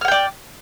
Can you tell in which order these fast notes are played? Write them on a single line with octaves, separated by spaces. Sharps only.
F6 F#5 G5 D5